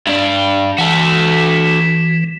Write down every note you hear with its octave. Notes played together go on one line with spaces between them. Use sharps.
G2 D4
E3 F#4 A4